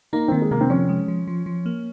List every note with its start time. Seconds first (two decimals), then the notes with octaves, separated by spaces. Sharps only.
0.13 A#3 D#4
0.28 C4
0.32 D#3 A#3
0.42 G#3
0.51 C3 A#3
0.61 C4
0.70 F3 C#4
0.89 G#3
1.08 F3
1.27 F3
1.46 F3
1.66 A#3